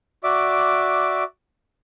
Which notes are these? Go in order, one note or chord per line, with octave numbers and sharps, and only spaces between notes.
F#4 D5 E5 D6